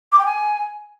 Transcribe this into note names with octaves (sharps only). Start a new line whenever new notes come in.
D6
G5
G#5